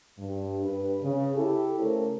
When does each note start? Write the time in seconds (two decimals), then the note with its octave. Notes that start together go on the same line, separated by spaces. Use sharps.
0.18 G2
0.64 G2 B4
1.02 C#3
1.36 E4 G4 A4
1.79 C#3 A3 A4 A#4 C5 C#5